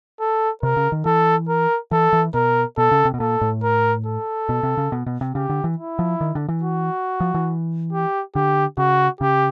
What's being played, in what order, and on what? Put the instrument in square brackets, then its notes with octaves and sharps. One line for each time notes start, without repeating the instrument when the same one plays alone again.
[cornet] A4
[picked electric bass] C3 [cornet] A#4
[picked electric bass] C#3
D#3
[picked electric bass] E3 [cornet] A4
[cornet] A#4
[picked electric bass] E3 [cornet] A4
[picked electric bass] E3
[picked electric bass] B2 [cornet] A#4
[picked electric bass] B2 [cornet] A4
[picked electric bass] C#3
C3
B2
[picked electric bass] A#2 [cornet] A4
[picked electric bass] A2
[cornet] A#4
A4
[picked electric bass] B2
C3
C#3
B2
B2
C3
[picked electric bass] C#3 [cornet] G4
[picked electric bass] D3
E3
[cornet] E4
[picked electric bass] F3
D#3
D3
E3
[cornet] F#4
[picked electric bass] F3
E3
[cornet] G4
[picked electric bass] D3 [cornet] G4
[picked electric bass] C#3 [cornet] F#4
[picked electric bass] C#3 [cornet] G4